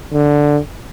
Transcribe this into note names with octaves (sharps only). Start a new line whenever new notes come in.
D3